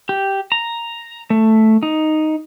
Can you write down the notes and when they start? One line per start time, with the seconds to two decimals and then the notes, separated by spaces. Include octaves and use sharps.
0.09 G4
0.52 A#5
1.30 A3
1.83 D#4